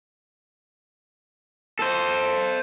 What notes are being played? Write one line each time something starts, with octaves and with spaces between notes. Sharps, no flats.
A4 C5